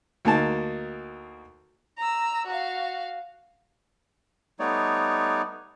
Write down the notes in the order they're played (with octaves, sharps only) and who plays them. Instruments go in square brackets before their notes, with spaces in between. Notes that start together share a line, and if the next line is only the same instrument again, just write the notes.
[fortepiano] D2 A#3 D#4 A5
[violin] A#5 E6
F#4 F5
[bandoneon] G3 A3 B3 D#4 C#5 D5